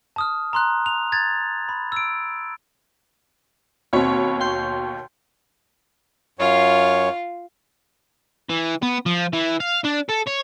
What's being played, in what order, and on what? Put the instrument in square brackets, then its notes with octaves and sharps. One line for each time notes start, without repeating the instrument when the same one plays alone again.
[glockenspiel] A5 D#6 F6
A#5 C6 F#6
F7
G#6 A6
B5
E6 D7
[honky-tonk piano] D#2 B2 C#5 [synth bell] C4 B5
[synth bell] G5 C6 G6
[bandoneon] F#2 C#5 [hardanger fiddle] F4 F5
[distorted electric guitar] E3
B3
F3
E3
F5
D4
A4
C#5